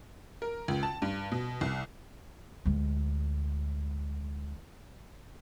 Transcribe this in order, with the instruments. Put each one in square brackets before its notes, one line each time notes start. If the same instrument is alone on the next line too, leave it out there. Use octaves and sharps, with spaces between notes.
[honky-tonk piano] A#4
C#2
A5
G2
B2
C2
[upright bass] D2 G#3